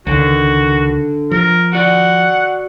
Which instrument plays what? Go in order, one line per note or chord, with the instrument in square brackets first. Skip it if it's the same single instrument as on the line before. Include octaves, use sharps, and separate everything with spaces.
[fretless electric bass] C#2 D#3 [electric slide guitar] D3 [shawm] F#4
[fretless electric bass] F3 [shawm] A#4
[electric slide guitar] F#4 D5 [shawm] F#5